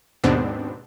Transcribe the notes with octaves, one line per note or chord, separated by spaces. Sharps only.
D#2 G#2 B2 B3 C4 D4